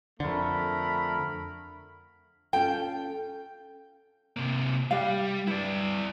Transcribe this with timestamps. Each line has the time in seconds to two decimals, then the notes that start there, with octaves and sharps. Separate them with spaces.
0.20 F2 D3 A3 A#4 B5
2.53 C#4 F4 A4 G5
4.37 C3 A#3
4.91 G3 G4 F5
5.48 G2 E4 D5